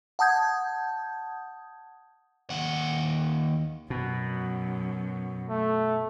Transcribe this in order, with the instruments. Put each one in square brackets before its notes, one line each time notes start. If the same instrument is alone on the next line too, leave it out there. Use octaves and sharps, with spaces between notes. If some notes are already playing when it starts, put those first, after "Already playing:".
[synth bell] F#5 A5 D#6 G6 G#6
[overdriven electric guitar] D#2 F#5
[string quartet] F#2 [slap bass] B2
[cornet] A3